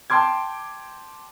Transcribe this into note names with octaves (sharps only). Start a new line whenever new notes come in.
G5 A5 C6 D6 G#6